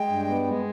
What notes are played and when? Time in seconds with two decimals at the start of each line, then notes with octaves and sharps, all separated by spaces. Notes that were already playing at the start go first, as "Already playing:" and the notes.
Already playing: G#3 G5
0.09 G2
0.28 B3
0.46 G#3